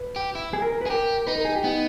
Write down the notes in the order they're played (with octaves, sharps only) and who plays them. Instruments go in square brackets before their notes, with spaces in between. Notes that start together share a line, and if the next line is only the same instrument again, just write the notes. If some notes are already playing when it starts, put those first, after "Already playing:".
Already playing: [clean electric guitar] B4
[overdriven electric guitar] G4
E4
[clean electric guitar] G#4
A#4
A#4
B4
[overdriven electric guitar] G#4
[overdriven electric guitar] G4 [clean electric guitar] A#4
[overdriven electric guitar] D#4 [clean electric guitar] B4
[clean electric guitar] A#4
G#4
G4
[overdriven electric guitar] B3 [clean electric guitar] D#4